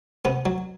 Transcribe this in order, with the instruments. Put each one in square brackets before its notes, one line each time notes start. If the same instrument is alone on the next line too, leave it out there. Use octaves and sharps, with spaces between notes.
[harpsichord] C3 B3
F#3